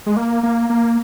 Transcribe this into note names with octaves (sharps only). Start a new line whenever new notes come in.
G#3
A#3
A#3
A#3